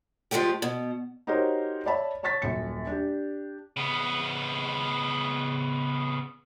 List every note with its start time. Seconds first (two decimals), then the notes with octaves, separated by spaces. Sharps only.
0.31 F3 F#3 G#3 A3 G4
0.62 B2
1.27 D#4 F#4 G4 A#4 C5 C#5
1.86 C#5 D5 E5 A5 B5
2.23 C#5 A5 C#6 A6 B6
2.42 D#1 F#2 C#7
2.87 D4 G4
3.77 C#3 B3